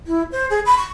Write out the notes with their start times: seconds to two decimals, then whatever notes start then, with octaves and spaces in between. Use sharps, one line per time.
0.07 E4
0.32 C5
0.50 G#4
0.66 B5
0.78 C#6